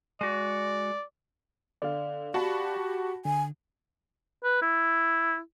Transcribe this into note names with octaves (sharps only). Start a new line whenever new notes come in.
G#3 F#4 D5
D3 D5 F5
F#4 G4 F#5 A5 B5
D3 G#5
B4
E4